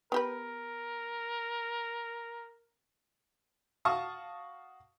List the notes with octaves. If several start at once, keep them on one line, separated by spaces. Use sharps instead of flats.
B3 G4 A#4 B4
F#4 F5 A5 C#6 D#6